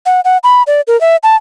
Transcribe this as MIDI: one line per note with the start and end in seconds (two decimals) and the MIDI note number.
0.06 0.21 78
0.25 0.38 78
0.44 0.63 83
0.67 0.81 74
0.87 0.99 70
1.01 1.16 76
1.23 1.36 81